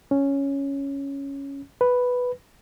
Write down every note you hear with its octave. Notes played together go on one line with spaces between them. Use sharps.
C#4
B4